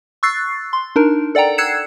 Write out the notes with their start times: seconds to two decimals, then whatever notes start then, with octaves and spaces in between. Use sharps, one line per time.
0.23 C#6 E6 F#6 A6 C7
0.73 C6
0.96 D4 D#4 A#4
1.35 A4 D5 F#5 G5 A#5
1.58 E6 F#6 G#6 C7 C#7 E7